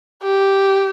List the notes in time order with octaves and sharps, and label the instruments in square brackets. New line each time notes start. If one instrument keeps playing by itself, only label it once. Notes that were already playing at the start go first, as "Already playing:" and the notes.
[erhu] G4